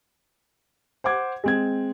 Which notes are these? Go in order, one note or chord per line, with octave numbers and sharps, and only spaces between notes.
C5 F#5 D6 G#6
G#3 C4 G#6